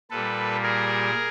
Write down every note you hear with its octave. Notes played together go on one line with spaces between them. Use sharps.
A#2 G3 A4 B4
G#4 A#4